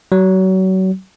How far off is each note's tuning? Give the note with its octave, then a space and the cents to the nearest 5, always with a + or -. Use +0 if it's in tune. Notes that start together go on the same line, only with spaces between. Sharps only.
F#3 +30